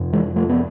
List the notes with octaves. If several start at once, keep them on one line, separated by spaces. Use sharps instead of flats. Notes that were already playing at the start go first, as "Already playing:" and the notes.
Already playing: F2 C3
E3 G#3
F3 A3
B3